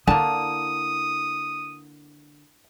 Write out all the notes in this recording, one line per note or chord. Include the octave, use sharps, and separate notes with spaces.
D3 A#3 E4 A5 D#6